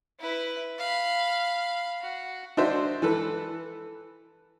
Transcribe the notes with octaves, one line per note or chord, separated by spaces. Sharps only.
E4 B4
F5 B5
F#4
D4 D#4 F#4 C5 E5
E3 A4 B4